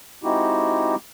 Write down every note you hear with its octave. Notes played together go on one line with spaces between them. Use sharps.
G#3 C4 D#4 E4 F#4 G4